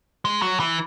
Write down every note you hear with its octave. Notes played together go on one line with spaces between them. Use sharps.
G#3
F#3
E3